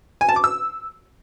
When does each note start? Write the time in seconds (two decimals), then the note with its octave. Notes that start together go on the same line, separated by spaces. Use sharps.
0.21 G#5
0.29 A5
0.36 D6
0.44 E6